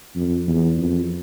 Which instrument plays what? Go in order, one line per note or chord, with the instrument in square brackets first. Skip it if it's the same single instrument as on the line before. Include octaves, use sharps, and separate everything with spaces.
[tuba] F2
E2
F2